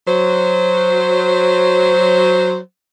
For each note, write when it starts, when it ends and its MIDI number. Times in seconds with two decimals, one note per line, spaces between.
0.07 2.58 54
0.07 2.58 72